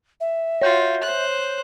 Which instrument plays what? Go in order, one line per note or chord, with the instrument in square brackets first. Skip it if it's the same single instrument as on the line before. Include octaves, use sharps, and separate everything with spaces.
[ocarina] E5
[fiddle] F4 F#4 [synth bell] C#5 G6
[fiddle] C5 F#6